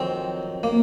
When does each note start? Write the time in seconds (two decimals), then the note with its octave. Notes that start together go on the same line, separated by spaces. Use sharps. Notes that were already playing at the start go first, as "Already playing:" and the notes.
Already playing: F2 D#3 F#3 C4
0.63 A#3